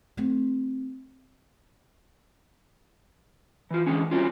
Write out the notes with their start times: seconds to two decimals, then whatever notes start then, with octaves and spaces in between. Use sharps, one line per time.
0.17 A3 C4
3.71 E3 F4
3.87 D3 E3 G#3 C#4
4.11 F#3 G3 C4 C#4 F4